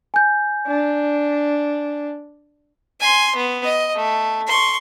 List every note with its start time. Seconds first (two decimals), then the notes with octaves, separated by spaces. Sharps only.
0.14 G#5 G6
0.67 D4
3.00 G#5 C6
3.36 B3
3.65 D#5
3.96 A3
4.48 C6 C#6